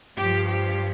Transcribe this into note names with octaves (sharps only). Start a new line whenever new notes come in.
G2 F3 G4
G4